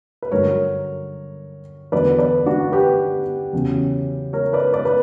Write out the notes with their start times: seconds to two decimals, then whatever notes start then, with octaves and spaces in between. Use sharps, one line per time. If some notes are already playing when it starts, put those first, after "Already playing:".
0.22 B4
0.32 G2 D3 F#3 A#4 C#5
1.92 E2 D3 F#3 B4 D5
2.19 B4 D5
2.46 D4 F#4
2.72 G4 B4
3.53 E2 C#3 F#3
4.33 A#4 C#5
4.53 B4 D5
4.74 B4 D5
4.85 B4